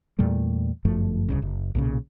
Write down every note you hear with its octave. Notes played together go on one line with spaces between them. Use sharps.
E2 A#2 G3 A3
G1 F#2 F3 A3
D1 C2 C#3
F#1
B1 A#2 C#3